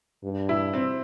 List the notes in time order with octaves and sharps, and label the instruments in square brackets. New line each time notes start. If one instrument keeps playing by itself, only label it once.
[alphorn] G2
[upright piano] E4
C4